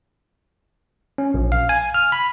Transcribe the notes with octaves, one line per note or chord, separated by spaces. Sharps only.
C#4
A#1
F5
G#5
F6
B5